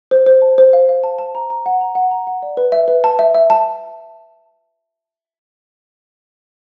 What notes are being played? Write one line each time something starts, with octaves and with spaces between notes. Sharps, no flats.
C5
C5
A5
C5
F5
F5
A5
A5
A#5
A#5
F#5
A#5
F#5
A#5
F#5
D5
B4
E5
B4
A5
E5
E5
A5